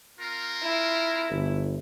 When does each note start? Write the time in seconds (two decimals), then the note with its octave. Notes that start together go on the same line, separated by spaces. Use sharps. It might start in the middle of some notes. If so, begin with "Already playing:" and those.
0.19 C4 F4 A#4
0.62 E4
1.30 G1